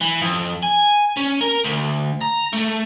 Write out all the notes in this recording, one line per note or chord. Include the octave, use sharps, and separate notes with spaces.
E3
F2
G#5
C#4
A#4
D2
A#5
A3